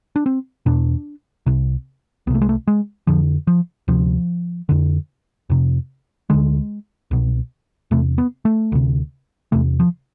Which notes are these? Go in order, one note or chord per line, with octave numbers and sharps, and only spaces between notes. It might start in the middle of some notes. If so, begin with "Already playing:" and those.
D4
C4
E2 B2 D4
C2 C3
C2 C3 A3 B3
G#3
A3
G#3
F2 D3 F3
F3
D2 C3 F3
F2 D3
F2 C3
D2 D3 G#3
C2 B2
E2 C3 A3
B3
A3
D2 C3
E2 C3 A3
F3